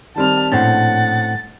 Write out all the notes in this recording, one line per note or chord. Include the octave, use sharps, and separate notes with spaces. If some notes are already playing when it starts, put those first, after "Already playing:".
D#3 G3 C4 A5 F6
A#1 A2 C4 C#4 F#5 A6